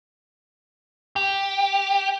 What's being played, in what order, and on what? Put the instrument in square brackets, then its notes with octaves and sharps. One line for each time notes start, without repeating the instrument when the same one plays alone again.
[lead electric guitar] G4